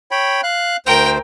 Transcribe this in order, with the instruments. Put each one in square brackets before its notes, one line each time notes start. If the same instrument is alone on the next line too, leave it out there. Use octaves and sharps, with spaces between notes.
[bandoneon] C#5 G5 B5
F5 F#6
[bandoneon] D2 C5 [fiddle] A#4 G5